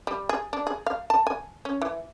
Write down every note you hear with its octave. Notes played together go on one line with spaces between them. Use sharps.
G3
G#4
D4
G#4
F5
A5
G#5
C#4
E3